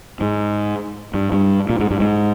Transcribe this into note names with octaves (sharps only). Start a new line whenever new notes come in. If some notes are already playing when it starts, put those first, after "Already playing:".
G#2
G2
G2
A#2
G#2
G2
G#2